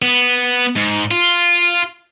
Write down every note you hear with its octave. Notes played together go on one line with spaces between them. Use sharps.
B3
G#2
F4